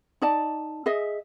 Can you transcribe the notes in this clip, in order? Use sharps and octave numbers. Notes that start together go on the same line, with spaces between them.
D#4 D5 A5
G#4 D#5 E5